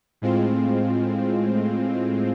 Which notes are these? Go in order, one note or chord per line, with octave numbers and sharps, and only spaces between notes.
A2 G#3 C4 F4